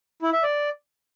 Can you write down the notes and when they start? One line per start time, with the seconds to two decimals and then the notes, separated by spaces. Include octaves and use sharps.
0.22 E4
0.33 E5
0.43 D5